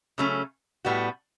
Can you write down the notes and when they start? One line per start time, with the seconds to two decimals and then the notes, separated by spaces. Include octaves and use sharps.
0.18 C#3 F#3 A3 C#4
0.85 A2 G3 B3 F#4